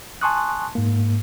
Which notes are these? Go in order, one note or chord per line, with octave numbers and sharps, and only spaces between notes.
G#5 A5 C6 C#6 D#6 F#6
G#2 A#3